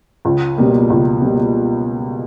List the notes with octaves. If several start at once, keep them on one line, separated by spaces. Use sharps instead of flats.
C#2
B2 G3 A#3
C#2
B2 G3 A#3